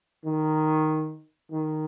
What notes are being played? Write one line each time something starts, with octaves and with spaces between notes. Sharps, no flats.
D#3
D#3